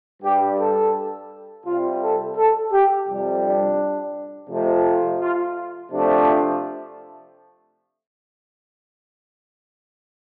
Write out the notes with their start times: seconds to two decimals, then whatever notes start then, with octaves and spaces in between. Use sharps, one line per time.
0.22 G2 G3 G4
0.58 A4
1.65 C3 G3 F4
2.01 A4
2.36 A4
2.72 G4
3.08 F2 C3 G3
3.43 D4
4.50 F2 C3 F3 A3
5.21 F4
5.92 C3 F3 A3 D4